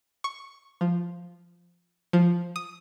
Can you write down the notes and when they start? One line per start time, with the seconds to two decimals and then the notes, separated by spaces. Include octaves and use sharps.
0.24 C#6
0.81 F3
2.13 F3
2.56 D#6